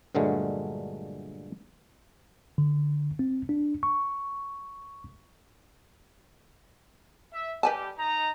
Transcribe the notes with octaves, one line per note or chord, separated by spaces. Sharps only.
G2 A#2 D3 F#3 G#3 A3
D3
C4
D4
C#6
E5
G3 G4 B4 G#5 A5
D#4 A#5